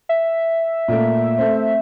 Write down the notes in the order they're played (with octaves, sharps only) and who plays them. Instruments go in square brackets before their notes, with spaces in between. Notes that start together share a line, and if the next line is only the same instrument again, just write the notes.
[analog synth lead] E5
[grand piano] A#2 A3 A#3
A3 C4